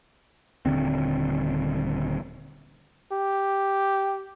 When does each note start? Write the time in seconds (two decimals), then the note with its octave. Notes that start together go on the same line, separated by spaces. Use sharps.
0.66 D#1 A#1 D3 C4
3.12 G4